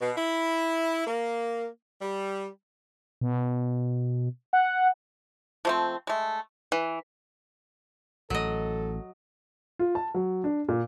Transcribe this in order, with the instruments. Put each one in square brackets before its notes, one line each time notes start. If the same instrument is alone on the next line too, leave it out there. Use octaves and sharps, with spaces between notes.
[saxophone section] B2
E4
A#3
G3
[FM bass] B2
[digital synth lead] F#5
[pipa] F3 A3 C4
G#3 A3
[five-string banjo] E3
[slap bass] A1 [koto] F#3 D#5 [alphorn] A4
[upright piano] F4
A5
F#3
D4
A#2